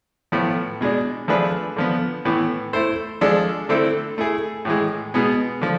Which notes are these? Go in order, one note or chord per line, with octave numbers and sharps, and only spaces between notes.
A2 F3 B3
B2 G#3 D4
F3 A3 D4 G#4 B4
D3 F3 B3
A2 E3 B3
A3 E4 A4 C5
F3 G#3 D4 A4
D3 A3 C4 E4 A4
A3 E4 G#4
A2 E3 G#3
B2 G#3 B3
D3 F3